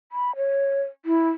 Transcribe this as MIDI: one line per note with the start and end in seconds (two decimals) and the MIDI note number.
0.12 0.36 83
0.36 0.83 73
1.06 1.29 64